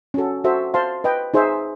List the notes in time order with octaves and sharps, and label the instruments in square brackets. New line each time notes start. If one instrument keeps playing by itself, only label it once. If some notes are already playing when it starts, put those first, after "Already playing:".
[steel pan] C#4 F#4 A4
F#4 A4 C5 E5
C5 F5 A5 C6
B4 D#5 G5
D#4 G#4 C5 E5